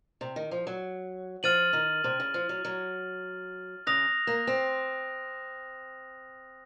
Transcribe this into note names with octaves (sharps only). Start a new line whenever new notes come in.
C3
D#3
F3
F#3
F3 F6 A6 D#7 F#7
D#3
C3
C#3
F3
F#3
F#3
C#3 D#6 F#6 A#6 F7
A#3
C4